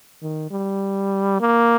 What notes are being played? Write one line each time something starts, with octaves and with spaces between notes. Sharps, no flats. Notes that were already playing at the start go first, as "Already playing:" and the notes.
D#3
G3
A#3